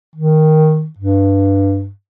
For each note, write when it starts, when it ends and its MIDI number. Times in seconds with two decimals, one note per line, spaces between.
0.16 0.88 51
0.98 1.90 43